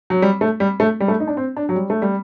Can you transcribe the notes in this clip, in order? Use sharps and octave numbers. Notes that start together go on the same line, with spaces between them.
F#3
G3
A3
G3
A3
G3
A3
D#4
D4
C4
D4
F#3
G3
A3
G3